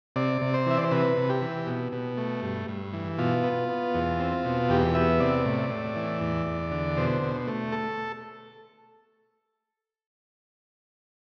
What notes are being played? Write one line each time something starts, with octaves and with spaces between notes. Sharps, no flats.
C3 D5
C3
C5
E3 E5
D5
C5
C3 B4
C3
G4
E3
B2
B2
A3
G2
G2
E3
B2 F4
B3
B3
E2
C4
B2
E2 G4
B3 E5
C3 D5
A2
A2
E3
E2
E2
D3
B2 C5
B2
A3
A4